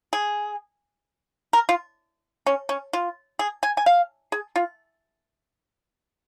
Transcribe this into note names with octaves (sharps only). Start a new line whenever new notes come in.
G#4
A#4
F4
C#4
C#4
F4
G#4
G#5
G#5
F5
G#4
F4